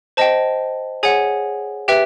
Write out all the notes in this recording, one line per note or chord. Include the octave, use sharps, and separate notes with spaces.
C5 D#5 G5 A5
G#4 C#5 F#5 G#5
G4 B4 E5 G5